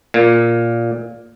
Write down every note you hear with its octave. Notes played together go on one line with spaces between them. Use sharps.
A#2